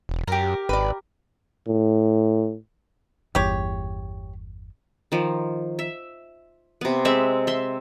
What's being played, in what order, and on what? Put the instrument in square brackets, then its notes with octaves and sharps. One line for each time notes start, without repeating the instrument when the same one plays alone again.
[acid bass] E1
[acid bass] F#2 [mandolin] G4 A#4
[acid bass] G#1 [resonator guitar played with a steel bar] B4 D5
[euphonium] A2
[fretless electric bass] G1 E2 [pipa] G4 C#5
[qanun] D#3 F3
E5
C3 B3
G#3 C4 E5
E5 C6